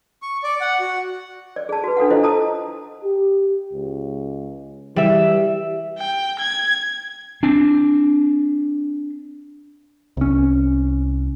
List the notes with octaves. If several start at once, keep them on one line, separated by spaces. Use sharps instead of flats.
C#6
D5
F#5
F#4
D5
G#4 A5
F#4 B4
D4 A4 F5 F#5
E4 F4 C5 D#5
A4 A5 A#5 D#6
G4
C#2
E3 G3 E5
G5
G#6
C4 D4
C2 C#4